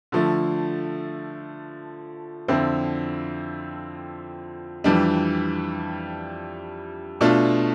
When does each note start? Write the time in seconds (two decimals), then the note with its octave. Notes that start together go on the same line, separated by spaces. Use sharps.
0.12 D3 F3 A3
2.48 F2 D3 F3 C4 E4
4.84 F2 E3 G3 D4
7.21 B2 A3 D4 F4